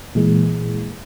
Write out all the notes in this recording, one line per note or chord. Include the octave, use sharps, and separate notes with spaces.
A#2 E3 G#3